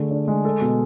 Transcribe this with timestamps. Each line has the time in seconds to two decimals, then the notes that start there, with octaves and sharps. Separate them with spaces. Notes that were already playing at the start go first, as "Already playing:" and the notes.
Already playing: D3 A3 G#4
0.11 D4
0.28 G#3
0.45 A4
0.61 B2